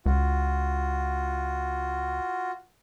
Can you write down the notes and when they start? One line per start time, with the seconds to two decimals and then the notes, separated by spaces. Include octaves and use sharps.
0.06 C#2 F4 F#4